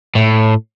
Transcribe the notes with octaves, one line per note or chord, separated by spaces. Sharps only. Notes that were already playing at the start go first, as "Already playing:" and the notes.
A2